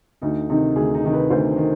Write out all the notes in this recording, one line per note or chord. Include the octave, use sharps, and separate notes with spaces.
D2 D#4
C3 D#3 D#4
D2 G#4
D#4
C3 D#3
B4
D2 C5
D#3